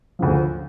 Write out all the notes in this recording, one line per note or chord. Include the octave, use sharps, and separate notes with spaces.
D2 C#3 F3